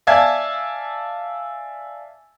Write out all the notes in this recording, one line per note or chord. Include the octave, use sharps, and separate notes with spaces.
D5 E5 F5 G#5 A5 G#6